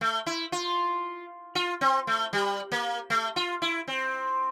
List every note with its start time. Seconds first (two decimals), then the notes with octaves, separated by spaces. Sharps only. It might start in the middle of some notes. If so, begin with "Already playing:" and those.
0.01 A3
0.26 E4
0.52 F4
1.55 F4
1.81 C4
2.07 A3
2.33 G3
2.72 A#3
3.10 A3
3.36 F4
3.62 E4
3.88 C4